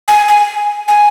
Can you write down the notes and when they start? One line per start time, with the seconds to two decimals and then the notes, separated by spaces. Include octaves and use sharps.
0.08 G#5
0.28 G#5
0.88 G#5